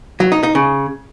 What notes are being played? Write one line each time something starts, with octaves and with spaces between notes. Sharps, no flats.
F#3
D#4
D#4
C#3